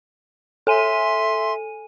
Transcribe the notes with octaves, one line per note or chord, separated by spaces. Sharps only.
A4 E5 G#5 C6 D#7